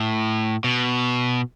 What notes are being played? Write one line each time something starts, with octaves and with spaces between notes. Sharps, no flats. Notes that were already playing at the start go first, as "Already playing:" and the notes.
Already playing: A2
B2